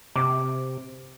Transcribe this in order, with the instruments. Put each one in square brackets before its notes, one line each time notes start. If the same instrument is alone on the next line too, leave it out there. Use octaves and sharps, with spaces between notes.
[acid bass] C3 [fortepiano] D6